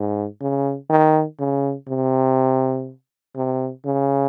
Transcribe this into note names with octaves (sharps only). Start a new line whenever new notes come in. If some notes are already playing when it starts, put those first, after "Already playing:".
Already playing: G#2
C#3
D#3
C#3
C3
C3
C#3